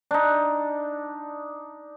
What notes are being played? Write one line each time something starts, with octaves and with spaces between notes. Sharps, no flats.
D4 D#4